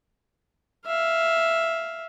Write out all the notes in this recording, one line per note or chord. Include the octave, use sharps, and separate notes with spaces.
E5 F5